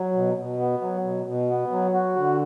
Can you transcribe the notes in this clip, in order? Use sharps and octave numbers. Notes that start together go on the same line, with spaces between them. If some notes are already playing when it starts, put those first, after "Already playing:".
Already playing: F#3
B2
B2
B3
F#3
B2
B2
B3
F#3
F#4
D3